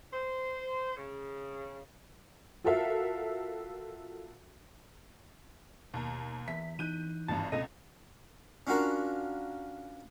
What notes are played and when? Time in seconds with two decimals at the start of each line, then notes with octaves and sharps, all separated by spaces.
0.14 C5
0.97 C#3
2.64 F4 F#4 A4 A#4 E5 F5
5.94 D#2 B2 A#5
6.48 E2 E5 B6
6.79 E3 D#4 F#6 G6 D#7
7.28 G#1 C#2 G2 A5
7.52 C#2 B2 C4 A4 D#5 A#6
8.67 C#4 D4 F4 F#4 A#4